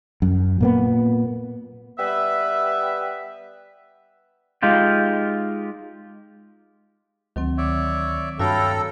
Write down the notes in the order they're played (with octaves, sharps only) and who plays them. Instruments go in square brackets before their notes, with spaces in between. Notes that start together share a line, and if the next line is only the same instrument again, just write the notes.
[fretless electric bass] F#2
A#2 A#3 B3
[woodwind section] G3 B3 B4 E5
[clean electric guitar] G#3 D#4 F4 G4
[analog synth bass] D2 [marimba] D#3 F#3 C4
[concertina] C#5 D5 E5
[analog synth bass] G2 [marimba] F#4 C#5 B5 [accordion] A4 [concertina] F5 G5 A#5